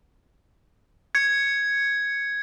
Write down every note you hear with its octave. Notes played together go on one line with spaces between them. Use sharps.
G#6 C#7